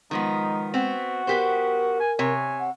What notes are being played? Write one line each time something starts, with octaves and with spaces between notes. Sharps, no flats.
D#3 F3 G#3 B3 D#4
B3 C4 F#4
B3 G4 A#4 C5
G#5
C3 C#5 G#5
F#5